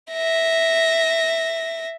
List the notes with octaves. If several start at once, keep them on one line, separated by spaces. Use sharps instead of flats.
E5 A#6